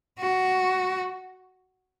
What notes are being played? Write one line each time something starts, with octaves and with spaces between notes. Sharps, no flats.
F#4